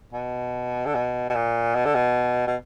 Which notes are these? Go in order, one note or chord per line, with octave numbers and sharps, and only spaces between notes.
B2
D3
B2
B2
A#2
B2
D3
B2
B2